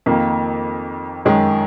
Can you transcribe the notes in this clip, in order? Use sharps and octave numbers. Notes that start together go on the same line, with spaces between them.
F2 D#3 A#3
F#2 D#3 G#3